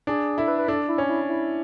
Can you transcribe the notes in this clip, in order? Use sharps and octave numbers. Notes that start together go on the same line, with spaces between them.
D4 G#4
E4 A4
B4
B4
D4 A4
E4
C#4
E4
E4